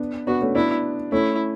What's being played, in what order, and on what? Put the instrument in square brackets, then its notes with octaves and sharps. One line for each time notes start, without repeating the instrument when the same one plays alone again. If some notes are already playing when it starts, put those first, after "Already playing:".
Already playing: [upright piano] B3 D4
[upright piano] B3 D4 [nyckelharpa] F#4
[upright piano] A3 C#4
[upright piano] B3 D4 [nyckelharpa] E4
[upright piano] A3 C#4 [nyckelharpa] E4